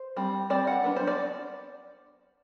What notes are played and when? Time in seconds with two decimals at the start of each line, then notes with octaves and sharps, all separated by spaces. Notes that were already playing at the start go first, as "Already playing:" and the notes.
Already playing: C5
0.16 G3 C4
0.50 G3 C4 D5
0.67 F#5
0.84 F#3 B3 D4
0.96 C5
1.07 D5